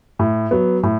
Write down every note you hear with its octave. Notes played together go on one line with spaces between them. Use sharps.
A2
F#3 B3
A2